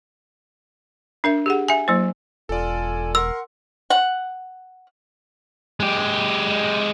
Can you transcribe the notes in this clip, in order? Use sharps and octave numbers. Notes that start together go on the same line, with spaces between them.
D4 A#4 E5
G4 G#4 F#5
E5 G#5
F#3 A#3 E4 C5
E1 F4 A4 D5 G#5
A#4 F#5 C6 E6
F#5
G#3 G4